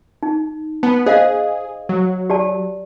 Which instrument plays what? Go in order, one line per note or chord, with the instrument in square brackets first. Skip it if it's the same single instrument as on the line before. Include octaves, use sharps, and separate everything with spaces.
[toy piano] D#4
[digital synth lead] B3 [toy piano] A5
[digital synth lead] G#4 [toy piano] C5 D#5 F5
[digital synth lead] F#3
[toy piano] G4 D5 A5